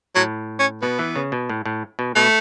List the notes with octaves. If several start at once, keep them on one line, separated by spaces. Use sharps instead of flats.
A2 F#3
C#4
B2 B3
E3
C#3
B2
A2
A2
B2
B2 A3